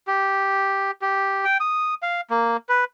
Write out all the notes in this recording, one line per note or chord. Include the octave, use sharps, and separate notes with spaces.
G4
G4
G5
D#6
F5
A#3
B4